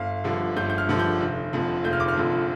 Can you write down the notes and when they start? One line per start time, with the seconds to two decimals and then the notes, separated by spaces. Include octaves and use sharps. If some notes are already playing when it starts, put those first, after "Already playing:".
Already playing: G1 F5
0.24 G2 D3 F3
0.57 G1 G6
0.70 G6
0.78 F6
0.89 G2 D3 F3
0.99 G6
1.20 F1
1.53 F2 D3 F3
1.84 F1 G6
1.93 F6
2.00 D6
2.08 F6
2.17 F2 D3 F3